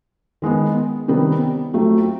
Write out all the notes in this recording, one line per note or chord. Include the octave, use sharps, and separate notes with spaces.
D#3 G#3 B3
C3 D#3 G3 B3
F#3 A3 C4 F4